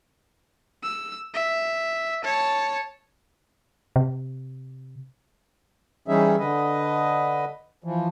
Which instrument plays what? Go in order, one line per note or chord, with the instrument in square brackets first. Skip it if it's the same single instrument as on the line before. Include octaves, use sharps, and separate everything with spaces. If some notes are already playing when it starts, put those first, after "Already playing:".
[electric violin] E6
E5
C#5 A5
[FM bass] C3
[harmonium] E3 G3 C#4 D#4 G#4 E5
D3 B4 D#5
E3 F3